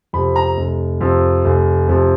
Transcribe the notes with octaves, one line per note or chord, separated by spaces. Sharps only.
F2 C3 B5
A#5
F1
F2 C3
F1
F2 C3